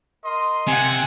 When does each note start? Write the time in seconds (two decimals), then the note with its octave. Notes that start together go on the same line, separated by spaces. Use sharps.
0.24 A#4 D#5 C6
0.68 C3 F#5 G#5